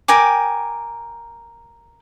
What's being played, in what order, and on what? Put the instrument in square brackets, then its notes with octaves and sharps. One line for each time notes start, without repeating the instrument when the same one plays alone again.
[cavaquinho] A#4 G5 G#5 D6